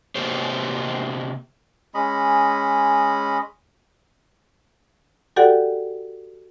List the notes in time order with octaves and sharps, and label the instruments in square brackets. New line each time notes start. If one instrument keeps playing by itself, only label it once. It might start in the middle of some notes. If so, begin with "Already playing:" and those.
[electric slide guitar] C3 A#3 B3 G4 C5
[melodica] G#3 C#4 D#5 B5
[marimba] F#4 G4 A4 D5 F#5 G5